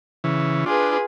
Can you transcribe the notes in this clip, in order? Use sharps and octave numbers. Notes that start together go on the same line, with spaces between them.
C#3 E3
D4 F4 G#4 B4